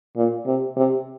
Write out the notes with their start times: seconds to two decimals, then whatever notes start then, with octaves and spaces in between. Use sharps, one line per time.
0.17 A#2
0.46 C3
0.77 C3